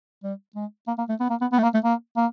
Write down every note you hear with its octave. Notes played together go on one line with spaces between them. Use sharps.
G3
G#3
A#3
A#3
A3
B3
A#3
B3
B3
A3
A#3
A3
A#3
A#3